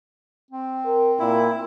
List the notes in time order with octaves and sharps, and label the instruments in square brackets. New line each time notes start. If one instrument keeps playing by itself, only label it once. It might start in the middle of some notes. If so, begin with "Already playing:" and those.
[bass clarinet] C4
[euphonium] A#4
[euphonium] A#2 [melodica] E4